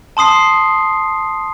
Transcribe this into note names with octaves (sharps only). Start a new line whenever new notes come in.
A5 C6 D#6 C7